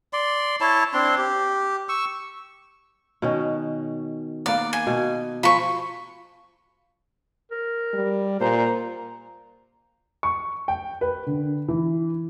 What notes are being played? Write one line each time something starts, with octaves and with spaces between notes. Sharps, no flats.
D5 C6
E4 C#5 A5
C4 D4 C6
G4
C#6 E6
B2 D#3 C#4
A#3 B3 D5 F#5
G#5
B2
F3 C5 B5 C#6
A#4
G3
A#2 C5 A#5
C#6
G5
B4
D3
E3